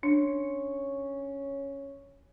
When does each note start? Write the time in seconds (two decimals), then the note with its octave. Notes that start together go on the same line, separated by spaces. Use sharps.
0.03 C#4 D4